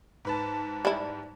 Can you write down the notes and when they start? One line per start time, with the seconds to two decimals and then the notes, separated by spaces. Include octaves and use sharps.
0.25 G#2 B4 A5
0.85 G3 E4